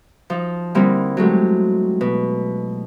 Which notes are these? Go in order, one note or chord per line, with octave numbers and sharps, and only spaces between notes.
F3 D#4
D3 G3 A#3 C4 D#4 E4
F#3 G#3 A3 G4
B2